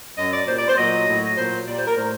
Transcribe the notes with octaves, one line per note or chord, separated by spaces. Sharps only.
F#2 F#3 D#5
D5
A#2 G3 C5
D5
C5
A#2 F#3 D#5
A2 F#3
A#2 F#3 C5
A#2 G3 D5
C5
A#4
A2 G3 C5